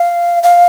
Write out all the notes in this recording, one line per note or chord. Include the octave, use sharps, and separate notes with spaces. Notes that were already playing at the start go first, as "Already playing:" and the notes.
Already playing: F5
F5